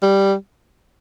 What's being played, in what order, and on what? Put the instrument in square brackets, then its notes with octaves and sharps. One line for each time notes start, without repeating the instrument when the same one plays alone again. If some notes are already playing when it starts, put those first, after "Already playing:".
[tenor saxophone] G3